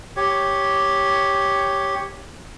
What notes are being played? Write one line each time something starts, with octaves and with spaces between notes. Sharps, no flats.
G4 C#5